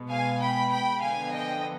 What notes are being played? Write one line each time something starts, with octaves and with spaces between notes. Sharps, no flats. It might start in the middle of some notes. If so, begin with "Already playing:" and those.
Already playing: B2 G#3 B3
F5 G#5
G5 B5
G5 B5
D3 F3 B3 F5 G#5
D#5 G5